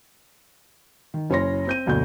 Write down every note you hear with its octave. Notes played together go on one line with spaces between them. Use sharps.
D#3
F#1 C#4 E4 C#5 C6 A#6
C4 G6 D#7
F#1 D2 B2 D3 G6